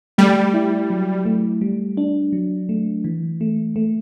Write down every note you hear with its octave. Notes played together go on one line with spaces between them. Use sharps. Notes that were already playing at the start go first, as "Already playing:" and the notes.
G3 A3
E4
F#3
A3
G3
D4
F#3
A3
E3
A3
A3